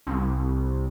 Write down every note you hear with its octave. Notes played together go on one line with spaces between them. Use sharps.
C2